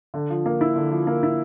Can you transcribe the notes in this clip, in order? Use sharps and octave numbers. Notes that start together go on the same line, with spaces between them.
D3
F3
A#3
E4
D3
F3
A#3
E4